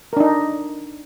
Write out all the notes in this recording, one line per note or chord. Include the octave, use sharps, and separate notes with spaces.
D4 D#4 A#4